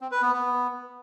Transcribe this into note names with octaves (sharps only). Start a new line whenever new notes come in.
C4
B4
B3
B3